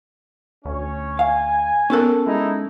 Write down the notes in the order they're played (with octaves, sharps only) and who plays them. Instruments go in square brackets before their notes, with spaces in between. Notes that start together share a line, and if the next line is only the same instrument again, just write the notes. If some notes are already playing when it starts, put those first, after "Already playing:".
[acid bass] D2 [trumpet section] C#4 C#5
[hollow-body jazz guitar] F5 [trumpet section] G#5
[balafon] B3 A#4 [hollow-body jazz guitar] C#4 A4 A5
[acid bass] G#3 [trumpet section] D#4 E4